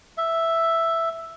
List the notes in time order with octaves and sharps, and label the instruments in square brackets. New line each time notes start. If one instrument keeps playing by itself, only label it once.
[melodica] E5